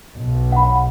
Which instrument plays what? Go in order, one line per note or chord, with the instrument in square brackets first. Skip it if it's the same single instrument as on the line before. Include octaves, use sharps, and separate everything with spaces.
[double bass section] B1
[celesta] F#5 B5